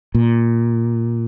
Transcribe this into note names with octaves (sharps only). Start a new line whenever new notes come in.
A#2